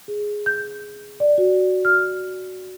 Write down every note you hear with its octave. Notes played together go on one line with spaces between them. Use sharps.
G#4
G6
D5
F#4
F6